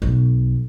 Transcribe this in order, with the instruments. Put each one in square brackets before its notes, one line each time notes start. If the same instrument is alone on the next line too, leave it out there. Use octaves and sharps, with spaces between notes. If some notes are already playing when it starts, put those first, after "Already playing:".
[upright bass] B1